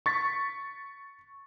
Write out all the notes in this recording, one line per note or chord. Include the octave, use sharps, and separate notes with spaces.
C#6 A6 B6